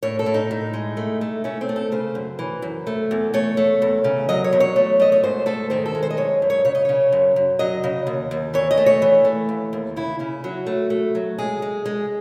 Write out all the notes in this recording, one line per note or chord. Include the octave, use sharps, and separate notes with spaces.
A2 C#5
A4
A2
D#4
A2
G#3
A3
A3
A3 C#4
C4
A3
A4
C#3 C5
F#2
E3
F#2
A3
E2
A3 C#5
A3
E2
C#3
F#3 D#5
C#5
E2
C#5
A3
A3 D#5
C#5
G#2 C5
A3 A4
D#3 C5
A4
G#3
C5
D#5
F#2 C#5
F#2
C#5
C#3 C#5
D#5
C#3 C#5
F#2
F#2
F#3 D#5
C#3
D#2
D#2
E3 C#5
D#5
A3
C#5
E3
A3
D#2
D#2
C#3 E4
C#3 E4
F#3 F#4
A3
A3
F#3
G#3 G#4
G#3
G#3